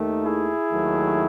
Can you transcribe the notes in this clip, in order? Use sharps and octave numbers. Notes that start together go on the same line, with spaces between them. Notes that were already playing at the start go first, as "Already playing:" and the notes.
Already playing: D#2 D#3 A3
E4 G#4
D#2 D#3 F#3 A3